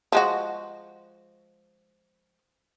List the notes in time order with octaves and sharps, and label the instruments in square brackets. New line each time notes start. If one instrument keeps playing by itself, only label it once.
[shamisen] F3 G#3 F#4